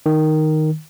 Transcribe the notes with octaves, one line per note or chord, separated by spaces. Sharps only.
D#3